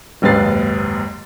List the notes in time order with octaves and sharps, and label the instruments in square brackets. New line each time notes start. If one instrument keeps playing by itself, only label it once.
[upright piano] F#1 D#2 G#2 B4 A6 C7